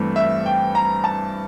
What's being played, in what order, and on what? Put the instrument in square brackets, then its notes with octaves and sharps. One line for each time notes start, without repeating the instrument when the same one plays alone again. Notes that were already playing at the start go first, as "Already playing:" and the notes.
Already playing: [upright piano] G2 E3 A3 C4
E5
G5
A#5
A5